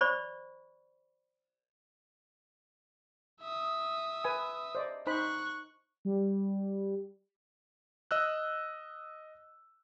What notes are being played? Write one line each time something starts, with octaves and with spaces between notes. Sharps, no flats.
C5 D5 B5 C#6
E5 D#6
B4 G#5
C5 D5 D#5
D#4 C5 B5 C#6 F#6
G3
D#5 E6 F#6